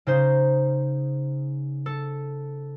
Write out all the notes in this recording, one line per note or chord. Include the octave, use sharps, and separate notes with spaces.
C#3 D#4 C5
A4